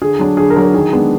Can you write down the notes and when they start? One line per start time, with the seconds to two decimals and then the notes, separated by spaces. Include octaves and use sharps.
0.02 D3 G#4
0.19 F#3 D4
0.37 D3 G#4
0.50 A#4
0.56 F#3 D4
0.62 A#4
0.74 D#3 G#4
0.93 G#3 B3 D4